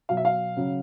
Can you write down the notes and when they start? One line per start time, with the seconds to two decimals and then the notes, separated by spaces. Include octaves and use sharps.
0.09 B2 F#3 F5
0.17 E5
0.25 F5
0.56 C#3 F#3